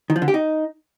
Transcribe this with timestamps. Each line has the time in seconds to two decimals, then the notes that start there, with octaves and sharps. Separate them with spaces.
0.10 D#3
0.16 F3
0.22 D3
0.28 G4
0.34 D#4